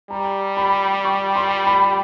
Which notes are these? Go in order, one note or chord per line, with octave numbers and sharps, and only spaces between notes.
G3 A#5
B5
C#6
C6
B5